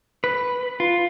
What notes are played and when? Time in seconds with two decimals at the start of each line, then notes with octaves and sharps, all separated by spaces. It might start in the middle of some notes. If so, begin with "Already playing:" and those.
0.24 B4
0.80 F4